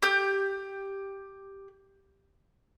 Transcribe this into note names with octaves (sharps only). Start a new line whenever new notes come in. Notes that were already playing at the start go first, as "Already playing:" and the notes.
G4 G6